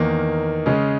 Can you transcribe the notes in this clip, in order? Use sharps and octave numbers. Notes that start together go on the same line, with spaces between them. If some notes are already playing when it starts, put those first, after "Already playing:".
Already playing: E2 D#3 A#3 D#4
C#3 G#3 C#4 G#4